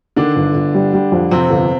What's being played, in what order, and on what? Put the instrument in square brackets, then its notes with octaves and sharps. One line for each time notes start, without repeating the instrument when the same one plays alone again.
[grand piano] D3 D4 [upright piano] D#3
[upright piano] G1
G1
G3
G3
F2
[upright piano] F2 [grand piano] C3 C4
[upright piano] G1